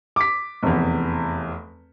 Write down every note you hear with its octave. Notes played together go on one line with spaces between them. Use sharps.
D6 B6
F1 E2